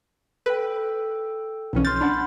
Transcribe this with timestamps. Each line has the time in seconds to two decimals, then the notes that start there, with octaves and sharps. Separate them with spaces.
0.46 A4 B4 G5
1.73 B1 E3 C#4
1.85 C6 F6 G6 A6
2.01 D4 F#5 B5